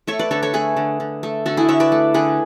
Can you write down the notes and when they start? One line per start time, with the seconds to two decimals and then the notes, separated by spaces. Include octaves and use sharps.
0.07 A3 C#5 E5
0.19 B4 D5
0.31 D3 A4 C#5
0.43 A4 C#5
0.53 A3 G#4 B4
0.77 D3
1.00 D3
1.23 A3
1.46 D3 F#4 A4
1.57 E4 G#4
1.68 D3 C#5 E5
1.80 B4 D5
1.92 A3
2.14 D3 G#4 B4